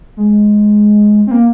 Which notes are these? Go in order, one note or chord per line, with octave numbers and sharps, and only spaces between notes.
G#3
C4
A#3